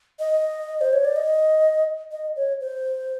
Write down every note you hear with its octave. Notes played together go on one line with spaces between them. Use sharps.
D#5
C5
C#5
D5
D#5
D#5
C#5
C5